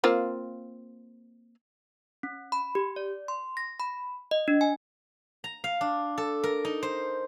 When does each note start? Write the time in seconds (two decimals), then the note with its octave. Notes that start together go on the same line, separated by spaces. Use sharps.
0.04 A#3 C4 F4
2.23 C#4
2.52 B5
2.75 G4
2.96 D5
3.28 C6
3.57 A#6
3.80 B5
4.31 D#5
4.48 D4
4.61 G#5
5.44 A#5
5.64 F5
5.81 D4
6.18 A4
6.44 A#4
6.65 D#4
6.83 C5